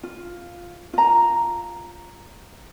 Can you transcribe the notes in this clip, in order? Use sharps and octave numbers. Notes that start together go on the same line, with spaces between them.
F4
F4 A#5